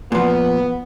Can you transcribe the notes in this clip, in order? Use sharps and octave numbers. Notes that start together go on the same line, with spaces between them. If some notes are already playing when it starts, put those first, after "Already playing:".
A#2 F3 B3